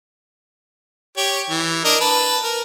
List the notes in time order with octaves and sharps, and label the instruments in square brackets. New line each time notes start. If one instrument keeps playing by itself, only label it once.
[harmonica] G4 C#5
E3
D4 A#4 D#5
B4 A5
A#4